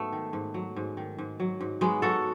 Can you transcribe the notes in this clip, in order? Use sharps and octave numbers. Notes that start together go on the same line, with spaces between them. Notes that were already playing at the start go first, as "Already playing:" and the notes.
Already playing: G#2 F#3 A3 B3
D#3
G#2
F#3
G#2
D#3
G#2
F#3
G#2
F#3 G#3 B3
F#3 F#4 A4